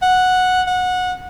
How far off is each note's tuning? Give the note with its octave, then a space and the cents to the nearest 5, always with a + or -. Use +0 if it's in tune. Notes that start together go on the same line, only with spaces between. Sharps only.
F#5 -10
F#5 -20